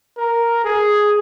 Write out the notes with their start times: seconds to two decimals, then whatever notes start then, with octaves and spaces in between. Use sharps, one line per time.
0.18 A#4
0.64 G#4